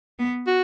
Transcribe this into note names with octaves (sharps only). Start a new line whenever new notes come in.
B3
F#4